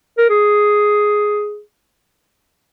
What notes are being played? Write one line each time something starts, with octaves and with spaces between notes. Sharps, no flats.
A#4
G#4